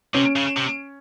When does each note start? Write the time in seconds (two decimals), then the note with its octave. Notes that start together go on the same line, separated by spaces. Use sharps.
0.14 C3 C#4
0.36 C#3
0.57 C3